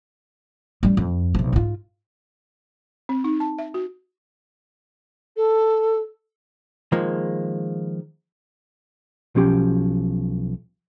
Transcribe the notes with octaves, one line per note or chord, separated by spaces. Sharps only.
G3 C#4
F2
B1 C3
G#2 F4
C4
D#4
A5
E5
F#4
A4
D#3 F3 G#3 A#3
B1 F3 C#4 G4 C6